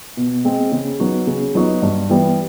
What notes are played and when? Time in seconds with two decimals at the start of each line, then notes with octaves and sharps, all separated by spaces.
0.17 B2
0.45 G#3 C4
0.72 C#3
1.00 F#3 B3 D#4 F#4
1.27 C#3
1.55 F#3 B3 D#4 F#4
1.82 G2
2.09 E3 G3 B3